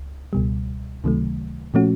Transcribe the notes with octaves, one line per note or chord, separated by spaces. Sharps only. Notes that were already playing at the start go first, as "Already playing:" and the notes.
Already playing: C#2
C#2 B2 G3
C#2 C3 D#3 F#3 A3
A#2 F3 A3 C#4 F#4